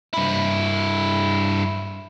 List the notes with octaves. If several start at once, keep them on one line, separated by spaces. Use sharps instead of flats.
G2 E4